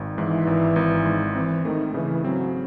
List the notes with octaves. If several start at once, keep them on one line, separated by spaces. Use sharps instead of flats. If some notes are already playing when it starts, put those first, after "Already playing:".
Already playing: G#1 D#3
G#2 E3
G#1
G#1
G#2
E3 C4
D#3 A3
C#3 E3
F#3 C4